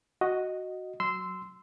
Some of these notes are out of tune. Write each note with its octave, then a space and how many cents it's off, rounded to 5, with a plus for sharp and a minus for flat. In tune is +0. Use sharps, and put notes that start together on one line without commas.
F#4 +0 D#5 +0
F#3 +0 C6 -15 E6 +0